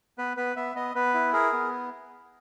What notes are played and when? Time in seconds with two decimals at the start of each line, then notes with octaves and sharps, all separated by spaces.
0.18 B3 B4
0.37 B3 B4
0.56 B3 E5
0.75 B3 D#5
0.95 B3 B4
1.14 E4
1.33 G#4 A#4
1.53 B3